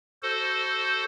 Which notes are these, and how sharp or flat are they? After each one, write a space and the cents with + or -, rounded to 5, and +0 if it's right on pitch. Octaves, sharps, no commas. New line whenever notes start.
F#4 +20 A4 +0 C5 +0